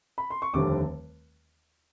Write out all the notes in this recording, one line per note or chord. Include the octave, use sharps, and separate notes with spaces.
B5
C6
C#6
F1 D#2 D3 G3 C4 D6